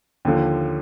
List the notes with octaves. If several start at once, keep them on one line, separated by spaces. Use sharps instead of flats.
D#2 D3 F3